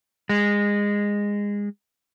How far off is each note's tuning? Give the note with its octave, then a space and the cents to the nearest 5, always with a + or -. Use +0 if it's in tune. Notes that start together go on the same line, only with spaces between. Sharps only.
G#3 -20